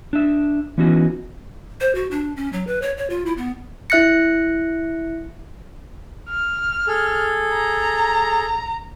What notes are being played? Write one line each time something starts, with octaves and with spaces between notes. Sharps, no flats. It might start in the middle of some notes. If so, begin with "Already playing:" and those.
D4 E5
E3 B3 C#4 D#4 F4 F#4
C5
F#4
D4
C#4
F#3
B4
C#5
C#5
F4
E4
B3
E4 E5 F#6 A#6 C#7
F6
G#4 A4
A#5